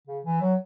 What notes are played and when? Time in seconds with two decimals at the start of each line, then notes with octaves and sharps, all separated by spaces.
0.07 C#3
0.25 E3
0.41 F#3